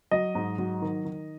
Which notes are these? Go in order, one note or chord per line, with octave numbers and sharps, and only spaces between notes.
F#3 D#5
G#2
F#3
D#3
D#3